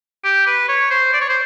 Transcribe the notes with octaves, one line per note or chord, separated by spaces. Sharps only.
G4
B4
C#5
C5
D5
C#5
C5